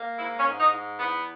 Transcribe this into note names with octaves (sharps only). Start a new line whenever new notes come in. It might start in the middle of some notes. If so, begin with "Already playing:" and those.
Already playing: A#3
G#2 E4
C#4
G#2
D#4
G#2
E2 B3